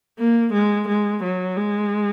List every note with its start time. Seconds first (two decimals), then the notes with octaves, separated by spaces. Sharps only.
0.19 A#3
0.54 G#3
0.88 G#3
1.23 F#3
1.57 G#3